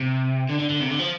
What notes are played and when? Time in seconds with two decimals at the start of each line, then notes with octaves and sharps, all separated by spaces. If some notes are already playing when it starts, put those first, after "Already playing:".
Already playing: C3
0.49 D3
0.59 D3
0.70 D3
0.81 C3
0.90 D3
1.00 F3